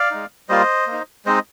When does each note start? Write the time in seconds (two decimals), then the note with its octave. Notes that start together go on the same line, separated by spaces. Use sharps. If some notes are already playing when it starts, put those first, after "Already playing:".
Already playing: D5 F5
0.11 G#3 D#4
0.49 G3 A#3 F4 C5 D#5
0.87 A#3
0.92 D#4
1.25 G#3 C4 D#4 C5 D#5